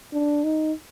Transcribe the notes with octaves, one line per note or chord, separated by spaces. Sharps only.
D4
D#4